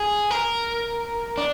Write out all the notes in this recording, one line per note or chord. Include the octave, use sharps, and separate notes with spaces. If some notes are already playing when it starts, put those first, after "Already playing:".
Already playing: G#4
A#4
D4